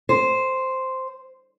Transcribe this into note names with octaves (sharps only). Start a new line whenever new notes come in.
C5